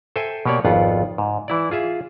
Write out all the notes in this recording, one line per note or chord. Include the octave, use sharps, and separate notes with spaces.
A4 C5 E5 G5 G#5
B2 A#3 G4 C#5 D5
G#1 F2 B3 F4 F#5
G#2
E3 E4 D5
F4 G#4 E5